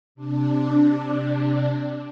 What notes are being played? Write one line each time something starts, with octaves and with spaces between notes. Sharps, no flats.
C3 D4